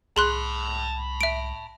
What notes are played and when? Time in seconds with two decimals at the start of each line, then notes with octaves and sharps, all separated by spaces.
0.16 C2 G#4 A5 B5 C6 F#6
1.21 E5 D7